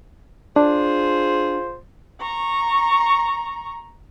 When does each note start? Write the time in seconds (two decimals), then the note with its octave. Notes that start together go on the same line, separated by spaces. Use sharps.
0.56 D4 F4 G#4 C5
2.21 A#5 C#6